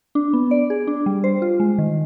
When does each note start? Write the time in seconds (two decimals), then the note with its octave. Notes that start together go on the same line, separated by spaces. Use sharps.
0.15 D4
0.33 B3
0.51 D5
0.70 G#4
0.87 D4
1.06 G3
1.24 C5
1.42 F4
1.60 G#3
1.78 D#3